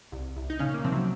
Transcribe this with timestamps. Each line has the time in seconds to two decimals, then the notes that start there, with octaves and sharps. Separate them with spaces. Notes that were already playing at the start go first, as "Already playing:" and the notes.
0.12 C2
0.37 C2
0.50 D#4
0.59 A#2 C#3 C#4
0.74 A#3
0.84 C3 F3 C4
0.92 F#3